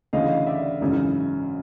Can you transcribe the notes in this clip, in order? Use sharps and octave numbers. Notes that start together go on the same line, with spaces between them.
D2 C#3 E3 D#5 F5
D5 E5
G#1 F#2 C#3 E3